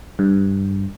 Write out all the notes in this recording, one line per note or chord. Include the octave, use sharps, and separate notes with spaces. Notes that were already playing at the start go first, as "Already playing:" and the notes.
G2